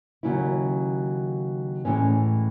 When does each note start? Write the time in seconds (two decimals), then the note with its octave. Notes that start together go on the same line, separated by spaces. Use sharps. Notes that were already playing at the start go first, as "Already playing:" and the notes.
0.23 D#2 C#3 F#3 C#4 E4
1.85 A2 E3 G#3 C#4